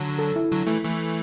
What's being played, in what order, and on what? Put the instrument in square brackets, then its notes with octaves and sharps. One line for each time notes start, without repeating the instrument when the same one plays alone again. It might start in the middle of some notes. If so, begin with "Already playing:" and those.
Already playing: [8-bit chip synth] D3 F#3
[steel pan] A4
E4
[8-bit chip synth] D3 F#3
E3 A3
E3 A3